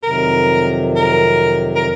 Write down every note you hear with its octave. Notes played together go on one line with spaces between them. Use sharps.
F2 C3 D#3 F#3 A#4
A#4
A#4